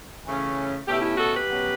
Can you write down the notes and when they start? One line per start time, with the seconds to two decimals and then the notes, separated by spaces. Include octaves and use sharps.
0.26 C#3 E3 A3 C#4
0.87 B2 A3 C#4 E4 G4
1.02 E4 G4
1.17 F#4 A4
1.33 G4 B4
1.49 B2 F#3 C#4